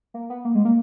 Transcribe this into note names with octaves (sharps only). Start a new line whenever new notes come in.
A#3
B3
A#3
G#3
A#3